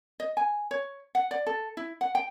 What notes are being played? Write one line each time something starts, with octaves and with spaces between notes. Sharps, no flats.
D#5
G#5
C#5
F#5
D5
A4
E4
F#5
G5